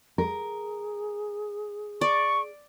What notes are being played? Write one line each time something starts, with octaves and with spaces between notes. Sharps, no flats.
G#4 A#4
D5 C#6